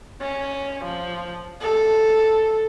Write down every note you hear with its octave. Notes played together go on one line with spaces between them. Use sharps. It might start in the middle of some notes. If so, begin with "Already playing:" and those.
C#4
F3
A4